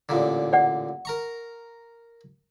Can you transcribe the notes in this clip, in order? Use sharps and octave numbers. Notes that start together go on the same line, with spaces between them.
A1 A#2 D3
D5 F#5
A#4 A#5 C#6